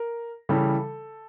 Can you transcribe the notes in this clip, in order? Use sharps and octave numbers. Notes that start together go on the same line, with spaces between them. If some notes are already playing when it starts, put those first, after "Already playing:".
Already playing: A#4
C#3 E3 G3 A4